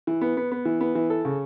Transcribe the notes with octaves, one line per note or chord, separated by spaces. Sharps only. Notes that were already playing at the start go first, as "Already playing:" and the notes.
E3
B3
B3
B3
E3
B3
E3
A4
C#3